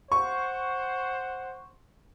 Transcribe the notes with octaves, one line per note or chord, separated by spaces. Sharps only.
C5 F#5 C#6